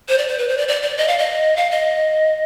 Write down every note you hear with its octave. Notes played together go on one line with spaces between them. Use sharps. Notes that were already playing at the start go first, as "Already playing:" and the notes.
C5
D5
C5
B4
C5
D5
D5
D5
D#5
F5
D#5
F5
D#5